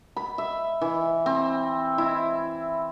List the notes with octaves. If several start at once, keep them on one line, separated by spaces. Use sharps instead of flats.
B5
E5
E3
C4
E4